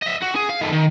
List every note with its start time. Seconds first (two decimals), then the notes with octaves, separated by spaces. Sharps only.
0.02 D#5 E5
0.22 F#4
0.35 G#4
0.49 F5
0.61 D#3 A3
0.72 D#3